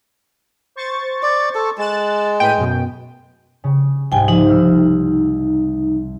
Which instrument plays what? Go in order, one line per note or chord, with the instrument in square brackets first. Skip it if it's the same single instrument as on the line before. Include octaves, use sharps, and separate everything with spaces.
[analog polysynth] C5 C#6 A6
[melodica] D5
A4
[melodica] G#3 [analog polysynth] F#6 A6 E7
[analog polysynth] A2 B4 D#7 [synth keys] G5
[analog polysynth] F#2 B2
[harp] C#3
[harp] C2 G#2 [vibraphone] G5 G#5
[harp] F3 [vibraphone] D#4
[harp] E6 F6 G6